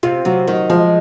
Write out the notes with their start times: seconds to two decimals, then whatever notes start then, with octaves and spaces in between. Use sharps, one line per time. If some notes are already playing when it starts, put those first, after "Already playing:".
0.03 C3 F4
0.25 C3 F#3
0.48 D#3 F#3
0.70 F3 G#3